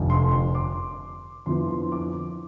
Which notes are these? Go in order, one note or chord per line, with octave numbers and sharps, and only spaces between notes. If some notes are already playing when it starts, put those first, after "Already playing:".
Already playing: F1 F2 D3
C6
C6
D6
F2 D3 F3 B3 E4 C6
C6
D6